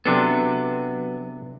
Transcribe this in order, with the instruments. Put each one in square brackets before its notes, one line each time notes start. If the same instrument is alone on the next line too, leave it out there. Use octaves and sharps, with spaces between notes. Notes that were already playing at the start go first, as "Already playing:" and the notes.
[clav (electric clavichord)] C3 D4 A4 [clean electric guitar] F#3 B3